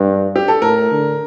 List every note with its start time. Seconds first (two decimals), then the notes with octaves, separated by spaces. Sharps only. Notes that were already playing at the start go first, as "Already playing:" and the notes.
Already playing: G2
0.36 G4
0.48 A4
0.61 A2 A#4
0.92 D3